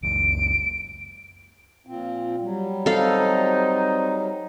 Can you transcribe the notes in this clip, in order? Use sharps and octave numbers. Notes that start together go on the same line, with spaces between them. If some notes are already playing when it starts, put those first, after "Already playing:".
F#1 C#2 D7
A#2 F3 C4
F#3 G3
C4 D#4 A4 F5